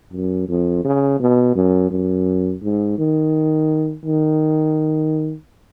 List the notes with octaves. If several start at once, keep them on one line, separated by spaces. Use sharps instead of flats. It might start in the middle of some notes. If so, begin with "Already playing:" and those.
F#2
F2
C#3
B2
F#2
F#2
G#2
D#3
D#3